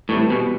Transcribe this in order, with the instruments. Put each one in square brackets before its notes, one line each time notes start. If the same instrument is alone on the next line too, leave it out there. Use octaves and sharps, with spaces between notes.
[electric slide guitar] A2 [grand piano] E3 G3 C4 E4
[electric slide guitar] B2